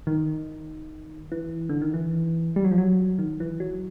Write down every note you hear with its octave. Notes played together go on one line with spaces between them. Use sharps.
D#3
E3
D3
D#3
E3
G3
F#3
F3
F#3
D#3
E3
F#3